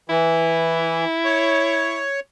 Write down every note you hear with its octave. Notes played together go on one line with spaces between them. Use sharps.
E3 E4
C#5